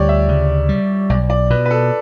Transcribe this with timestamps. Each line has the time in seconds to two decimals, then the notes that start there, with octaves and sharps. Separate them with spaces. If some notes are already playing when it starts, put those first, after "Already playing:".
Already playing: D2 G3 G4 C#5 D5
0.09 E5
0.29 C#3
0.69 G3
1.10 B1 D5
1.30 D5
1.50 B2 B4
1.65 B4
1.71 A4